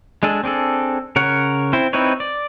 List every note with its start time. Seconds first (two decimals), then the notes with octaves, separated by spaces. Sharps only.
0.23 G#3 D4 G#4 A4
0.44 C4 D4 G#4 A4
1.16 C#3 A#4 C#5 F#5
1.73 C4 E4 C5
1.93 C4 D#4 E4 B4 C#5
2.20 D5